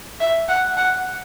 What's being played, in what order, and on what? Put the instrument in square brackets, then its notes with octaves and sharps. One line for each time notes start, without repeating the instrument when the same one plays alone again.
[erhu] E5
F#5
F#5